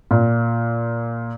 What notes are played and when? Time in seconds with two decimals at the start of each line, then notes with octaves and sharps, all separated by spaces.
0.11 A#2